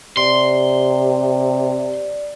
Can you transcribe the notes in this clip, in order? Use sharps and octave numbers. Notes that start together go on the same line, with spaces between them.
C3 D5 C6